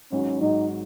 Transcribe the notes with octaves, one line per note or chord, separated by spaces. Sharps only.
G#1 G#2 F#3 C#4
G#1 G#2 F#3 D#4